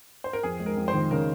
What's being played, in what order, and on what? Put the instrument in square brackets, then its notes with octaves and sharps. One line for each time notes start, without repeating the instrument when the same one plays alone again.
[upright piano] C5
A#4
[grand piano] F2 [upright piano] G#4
[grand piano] G#3
[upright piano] A#4
[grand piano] F2
[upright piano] C5
[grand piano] D#3
[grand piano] C#3 [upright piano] A#4